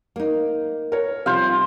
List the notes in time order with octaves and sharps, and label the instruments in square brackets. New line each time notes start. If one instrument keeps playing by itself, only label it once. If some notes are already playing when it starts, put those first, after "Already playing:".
[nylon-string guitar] A#3 D#4
[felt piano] A#4 C#5
[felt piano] C3 F3 G3 [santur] C5 F5